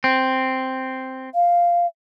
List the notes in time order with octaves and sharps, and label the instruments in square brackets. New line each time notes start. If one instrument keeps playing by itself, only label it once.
[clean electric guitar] C4
[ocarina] F5